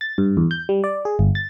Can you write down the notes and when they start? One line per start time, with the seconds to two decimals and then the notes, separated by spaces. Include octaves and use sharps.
0.01 A6
0.18 G2
0.37 E2
0.51 G6
0.69 G3
0.84 D5
1.05 G#4
1.19 G1
1.35 A6